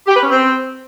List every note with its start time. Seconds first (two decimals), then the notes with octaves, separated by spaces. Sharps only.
0.07 G4
0.15 B4
0.23 C#4
0.30 C4